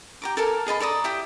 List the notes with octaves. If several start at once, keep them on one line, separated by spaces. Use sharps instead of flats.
G4 A#5 D6
A4 A#4 G#5 A5
G#4 D#5 A5 B5
A4 D5 A#5 D#6
E4 G4 E5 D#6